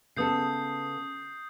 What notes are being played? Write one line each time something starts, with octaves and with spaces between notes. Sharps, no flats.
C#3 B3 A4 D#6 G6 C7